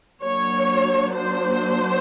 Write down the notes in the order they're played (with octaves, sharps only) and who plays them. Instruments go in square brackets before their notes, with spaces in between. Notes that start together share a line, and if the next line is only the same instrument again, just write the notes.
[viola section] F#3 A#3 D4 C#5
C5